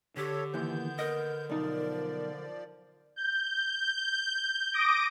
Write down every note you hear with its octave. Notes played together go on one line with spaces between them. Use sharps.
D3 G4 A4 C#5
D#2 A#2 E3 B3 G6
A#4 D#5
B1 F3 D#4 D5
G6
D6 D#6 A#6 D7